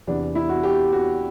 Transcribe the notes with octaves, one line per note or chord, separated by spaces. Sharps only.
E2 C3 E3 B3 D4
E4
F#4
G4
F#4